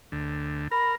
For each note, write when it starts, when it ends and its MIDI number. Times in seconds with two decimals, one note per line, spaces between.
0.12 0.68 38
0.71 0.95 70
0.71 0.92 83